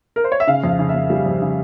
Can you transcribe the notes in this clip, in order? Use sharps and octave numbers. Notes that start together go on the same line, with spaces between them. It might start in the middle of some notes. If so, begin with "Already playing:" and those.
A#4
C5
C#5
E5
C#3 F5
F2
F5
C#3
E5
F2
G3
F2
C#3